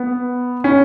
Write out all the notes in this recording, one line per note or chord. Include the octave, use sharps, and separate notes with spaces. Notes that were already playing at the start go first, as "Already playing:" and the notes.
Already playing: B3
C#4